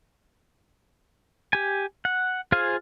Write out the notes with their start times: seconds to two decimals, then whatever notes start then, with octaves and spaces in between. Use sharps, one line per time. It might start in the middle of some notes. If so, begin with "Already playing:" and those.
1.53 G4 G#5
2.05 F#5
2.52 F4 G#4 C5 F5 G#5